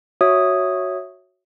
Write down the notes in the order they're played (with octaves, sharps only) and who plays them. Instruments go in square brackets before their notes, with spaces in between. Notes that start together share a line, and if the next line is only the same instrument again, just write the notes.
[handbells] F#4 C#5 E5 D#6